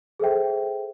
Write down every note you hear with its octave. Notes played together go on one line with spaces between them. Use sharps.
G#4 A4 C5 E5 G5